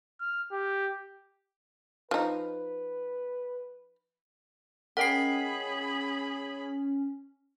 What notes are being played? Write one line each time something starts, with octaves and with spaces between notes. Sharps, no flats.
F6
G4
F3 D#4 B4
C#4 G#4 A#4 D#5 F#5 G5 B5 C7